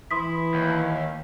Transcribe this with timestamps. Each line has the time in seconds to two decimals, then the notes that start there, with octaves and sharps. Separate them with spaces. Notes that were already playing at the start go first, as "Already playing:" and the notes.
0.11 E3 E4 C6 D#6 B6
0.54 D#2